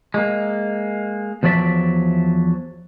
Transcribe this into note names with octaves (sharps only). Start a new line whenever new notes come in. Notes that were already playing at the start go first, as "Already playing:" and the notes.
G#3 A#3
E2 F3 F#3 D5 E5